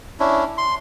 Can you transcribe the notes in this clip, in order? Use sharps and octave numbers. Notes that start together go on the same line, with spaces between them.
C#4 D4 E4
C6